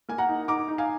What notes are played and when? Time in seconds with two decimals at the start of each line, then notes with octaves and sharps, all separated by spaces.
0.09 A#3 G#5
0.18 F#5 A#5
0.29 D#4
0.48 D#4 A#5 D6
0.68 D#4
0.78 F5 G#5